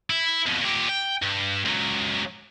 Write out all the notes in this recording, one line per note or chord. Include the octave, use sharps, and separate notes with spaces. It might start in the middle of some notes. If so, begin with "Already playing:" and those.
E4
F2 B2
A#2 G4
G5
G2
C#2 F#3